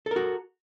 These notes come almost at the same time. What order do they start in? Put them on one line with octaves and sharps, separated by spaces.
A4 A#4 F#4